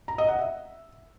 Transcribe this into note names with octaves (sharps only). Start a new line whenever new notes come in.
A#5
D#5
F#5
E5